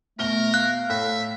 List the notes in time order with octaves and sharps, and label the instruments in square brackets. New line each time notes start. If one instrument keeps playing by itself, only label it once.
[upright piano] B2 F6 G7 [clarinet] A3 [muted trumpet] A#4
[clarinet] F5 [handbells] F#6
[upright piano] A2 [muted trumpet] E5